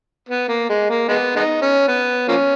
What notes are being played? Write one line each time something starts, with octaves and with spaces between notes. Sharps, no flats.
B3
A#3
G#3
A#3
G#3 B3
G#3 B3 D#4
C#4
B3
F3 A#3 C#4